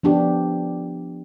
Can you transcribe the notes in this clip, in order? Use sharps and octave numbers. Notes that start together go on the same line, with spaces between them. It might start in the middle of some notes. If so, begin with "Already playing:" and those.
F3 B3 D4 G4